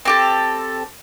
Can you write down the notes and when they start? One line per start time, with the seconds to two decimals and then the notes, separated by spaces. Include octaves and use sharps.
0.05 C4 G4 A4